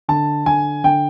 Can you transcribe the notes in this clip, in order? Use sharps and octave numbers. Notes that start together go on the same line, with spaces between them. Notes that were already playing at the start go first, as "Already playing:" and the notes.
D3 A5
D3 G#5
D3 G5